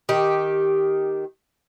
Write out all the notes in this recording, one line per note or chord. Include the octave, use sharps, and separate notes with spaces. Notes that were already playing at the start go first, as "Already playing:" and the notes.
D#3 G4